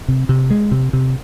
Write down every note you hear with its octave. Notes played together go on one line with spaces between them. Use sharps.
C3
C3
G#3
C3
C3